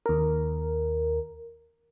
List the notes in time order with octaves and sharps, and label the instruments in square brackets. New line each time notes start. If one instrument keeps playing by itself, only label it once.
[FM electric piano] D#2 A#4